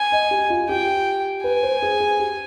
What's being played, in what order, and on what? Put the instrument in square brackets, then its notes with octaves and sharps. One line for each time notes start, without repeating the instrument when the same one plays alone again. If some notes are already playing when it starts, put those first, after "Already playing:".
Already playing: [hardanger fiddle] G#5
[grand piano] D#5
G4
F4
[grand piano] G4 [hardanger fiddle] G5
[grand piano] B4 [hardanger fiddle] G#5
[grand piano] C5
G#4
G#4
G4